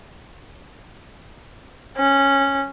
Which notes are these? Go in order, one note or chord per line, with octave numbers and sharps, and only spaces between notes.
C#4